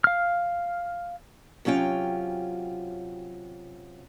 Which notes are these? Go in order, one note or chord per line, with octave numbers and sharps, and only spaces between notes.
F5 F6
C3 F#3 C#4 F4 G5